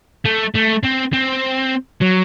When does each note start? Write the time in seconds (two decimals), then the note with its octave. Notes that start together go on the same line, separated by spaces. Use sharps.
0.25 A3
0.54 A3
0.83 C4
1.13 C4
2.01 F#3